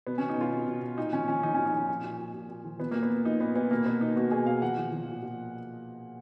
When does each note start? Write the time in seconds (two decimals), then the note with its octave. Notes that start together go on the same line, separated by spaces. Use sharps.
0.07 B2 B3
0.18 C#4
0.21 B2
0.29 D#4
0.37 B2 F4
0.52 B2
0.67 B2
0.82 B2
0.98 A#2 D#4
1.13 F3 C#4
1.28 F3 C#4
1.43 F3 D#4
1.54 C#4
1.58 A#2
1.66 D#4
1.74 F3
1.89 A#2
2.04 A#2
2.19 A#2
2.34 A#2
2.49 A#2
2.65 F3
2.79 F3 B3
2.91 A#3
2.95 A#2
3.03 B3
3.10 A#2
3.25 A#2 D#4
3.40 A#2 B3
3.55 A#2 B3
3.71 B2 A#3
3.86 B2 B3
4.01 B2 D#4
4.16 B2 F#4
4.31 B2 G#4
4.46 B2 F5
4.62 F3 F#5
4.78 F3
4.92 F3
5.08 A#2
5.23 A#2